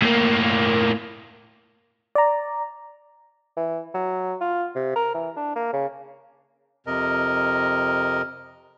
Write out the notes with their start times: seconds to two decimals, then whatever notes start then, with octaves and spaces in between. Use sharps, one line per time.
0.02 A2 A#3
2.15 D5 A#5
3.57 E3
3.95 F#3
4.41 F4
4.76 C3
4.96 A#4
5.15 E3
5.36 D4
5.56 A#3
5.73 C#3
6.86 F2 C3 A#4 D#5